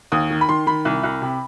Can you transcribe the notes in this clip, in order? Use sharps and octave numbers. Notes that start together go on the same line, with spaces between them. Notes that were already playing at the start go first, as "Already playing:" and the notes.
D#2 D#6
D#3
B5
D#3 C6
D#3 B5
C2
C2
C3